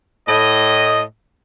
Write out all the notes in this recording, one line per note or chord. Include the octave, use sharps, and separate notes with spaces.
A2 D#5